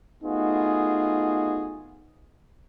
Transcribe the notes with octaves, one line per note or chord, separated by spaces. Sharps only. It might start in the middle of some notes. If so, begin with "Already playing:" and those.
A3 B3 D#4 F4 F#4 G#4